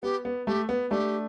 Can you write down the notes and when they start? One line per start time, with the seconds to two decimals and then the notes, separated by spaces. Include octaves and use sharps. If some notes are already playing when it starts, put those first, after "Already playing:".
0.03 B3 G4
0.25 B3
0.47 A3 G4
0.69 B3
0.91 A3 D4 G4